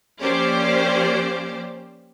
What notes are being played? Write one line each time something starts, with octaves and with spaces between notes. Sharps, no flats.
F3 A#3 C#4 G4 C5 D5